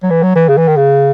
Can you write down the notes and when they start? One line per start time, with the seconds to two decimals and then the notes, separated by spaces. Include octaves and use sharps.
0.03 F#3
0.10 E3
0.23 F#3
0.36 E3
0.49 C#3
0.58 E3
0.68 D#3
0.77 C#3